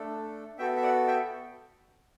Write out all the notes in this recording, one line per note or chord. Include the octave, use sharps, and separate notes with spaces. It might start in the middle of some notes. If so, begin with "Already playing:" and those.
Already playing: A3 D4 A4
B3 F#4 A4 E5 G5
E5
D5 F#5
E5 G5